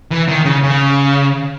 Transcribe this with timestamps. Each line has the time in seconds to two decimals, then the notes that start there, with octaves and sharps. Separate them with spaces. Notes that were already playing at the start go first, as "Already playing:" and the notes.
0.11 E3
0.28 D#3
0.45 C#3
0.63 C#3